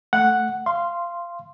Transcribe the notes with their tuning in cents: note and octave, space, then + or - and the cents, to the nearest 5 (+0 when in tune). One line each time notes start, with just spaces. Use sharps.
A3 +0 F#5 +0
F5 -20 C6 +0